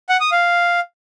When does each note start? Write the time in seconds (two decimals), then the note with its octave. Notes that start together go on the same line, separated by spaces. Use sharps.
0.09 F#5
0.20 D#6
0.32 F5